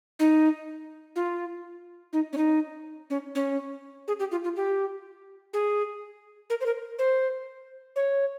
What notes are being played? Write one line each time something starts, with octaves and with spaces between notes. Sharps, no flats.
D#4
F4
D#4
C#4
D#4
C#4
C#4
G#4
G4
F4
F4
G4
G#4
A#4
C5
A#4
C5
C#5